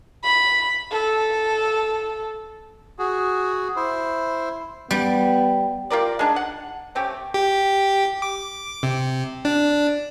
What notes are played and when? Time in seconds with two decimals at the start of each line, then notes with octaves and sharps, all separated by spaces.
0.24 B5
0.92 A4
2.99 F#4 G#4
3.76 E4 C5
4.91 G3 B3
5.90 F4 G4 A#4 D5
6.19 G#3 D4 D#4
6.36 F#5
6.95 A3 C4 C#4 G4
7.34 G4
8.22 D6
8.83 C3
9.45 D4